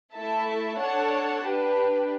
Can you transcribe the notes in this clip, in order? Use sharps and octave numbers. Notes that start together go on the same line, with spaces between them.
A3 E4 A4 E5 A5
D4 A4 C#5 F#5 A5
D4 G4 B4